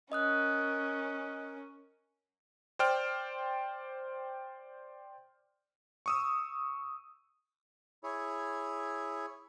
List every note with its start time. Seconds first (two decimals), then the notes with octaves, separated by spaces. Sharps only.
0.12 C#4 A#4 D#5 D#6 F#6
2.79 C5 D5 G5 F6
6.06 C#6 D#6 E6
8.04 E4 G#4 C#5